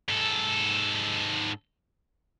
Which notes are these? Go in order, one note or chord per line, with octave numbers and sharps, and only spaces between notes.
G#2 A4